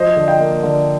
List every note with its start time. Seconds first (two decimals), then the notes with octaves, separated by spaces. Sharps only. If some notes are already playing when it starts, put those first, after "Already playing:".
Already playing: F3 C5 D#5
0.16 D3
0.28 D#5 G5
0.40 A#3
0.63 D3